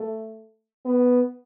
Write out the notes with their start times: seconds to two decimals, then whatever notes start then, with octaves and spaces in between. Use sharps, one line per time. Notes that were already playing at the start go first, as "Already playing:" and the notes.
Already playing: A3
0.85 B3